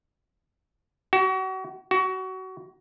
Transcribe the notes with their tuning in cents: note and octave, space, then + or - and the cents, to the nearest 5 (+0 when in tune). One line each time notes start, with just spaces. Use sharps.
F#4 +35
F#4 +25